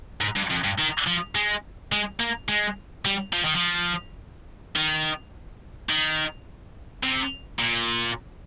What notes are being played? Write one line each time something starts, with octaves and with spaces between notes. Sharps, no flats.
G#2
G2
F2
G2
D#3
F3
G#3
G#3
A#3
G#3
G3
F3
D#3
F3
D#3
D#3
C3
A#2